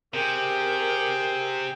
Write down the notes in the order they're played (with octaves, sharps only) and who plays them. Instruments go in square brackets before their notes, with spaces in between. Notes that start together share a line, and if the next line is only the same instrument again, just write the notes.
[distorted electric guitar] C3 [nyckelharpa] G#4 G5 [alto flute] A#4